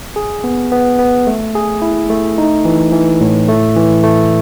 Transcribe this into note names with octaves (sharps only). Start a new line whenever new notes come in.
G#4
B3
B3
B3
A3
G#4
E4
A3
D#4
E3
E3
A2
A3
E3
A3